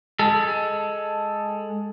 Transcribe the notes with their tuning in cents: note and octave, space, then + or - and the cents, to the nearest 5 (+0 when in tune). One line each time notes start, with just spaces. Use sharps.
G#3 +0 A4 +0